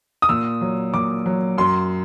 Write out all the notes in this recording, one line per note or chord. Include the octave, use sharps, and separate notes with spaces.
D#6
A#2 E6
F#3
A#2 D6
F#3
F#2 C6